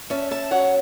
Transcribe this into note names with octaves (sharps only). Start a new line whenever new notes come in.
C#4 E5 A5
E5 A5
F#3 C#5 F#5